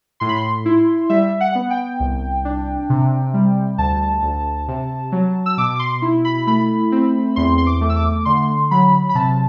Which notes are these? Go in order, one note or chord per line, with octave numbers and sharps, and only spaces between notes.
A2 C6
B5
C6
E4
G3 E5
F#5
B3
G5
C2
D4
C3
G3
D2 A5
D2
C3
F#3
E6
B2 D6
D6
C6
E4
B5
A3 B5
C4
E2 C6
C6
D6
A3
E6
D6
D3 C6
F#3 B5
B5
C3 A5